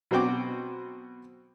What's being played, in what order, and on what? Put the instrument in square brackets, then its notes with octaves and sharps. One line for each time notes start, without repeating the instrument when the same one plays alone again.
[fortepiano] B2 F#3 C4 F#4 G5 D6